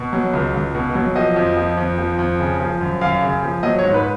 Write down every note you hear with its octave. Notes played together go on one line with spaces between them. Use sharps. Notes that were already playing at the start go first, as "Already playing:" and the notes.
Already playing: B2
F#3
C#2
C#2
B2
F#3
F3 D#5
F2
F3
F2
F3
F2
C#3
F3
F#2
F#2 F5
C#3
F3
F#3 D#5
C#5
G#2
B4